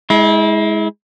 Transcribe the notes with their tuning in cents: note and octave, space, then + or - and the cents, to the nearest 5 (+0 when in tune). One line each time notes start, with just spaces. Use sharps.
G#3 +10 E4 -30